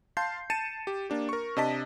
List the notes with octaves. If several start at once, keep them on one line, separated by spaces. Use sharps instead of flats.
F5 A5 C6 G6 C7
A5 A6 C#7 D#7 E7
G4
A#3 D4 G4
A#4 C#6
C3 D4 D#5 A5 B6